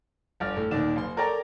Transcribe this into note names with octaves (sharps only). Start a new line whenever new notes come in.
G1 D5 F6
A2
D#1 D#2 D#3 D5 E7
F#1 C6
A4 A#4 C#5 D5 G5 A#5